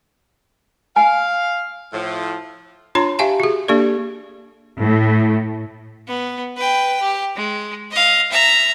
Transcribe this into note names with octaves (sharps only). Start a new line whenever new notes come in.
F5 G#5
A2 F3
D4 F4 C#5 A#5 C6
G4 E5 F5 G#5 A5
F#4 G#4
A#3 D4 G4 A4 D5
A2
B3
B4 G5
G4
G#3
D#5 F5
E5 A#5